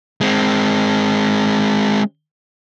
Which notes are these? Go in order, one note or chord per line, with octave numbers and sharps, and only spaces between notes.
G#3 C4